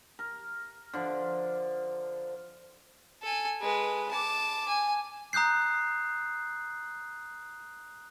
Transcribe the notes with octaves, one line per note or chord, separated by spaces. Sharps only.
A#4
D3 F3
A4 G#5
G#3 B4
A5 D6
G#5
A#5 D#6 F#6 G6 C7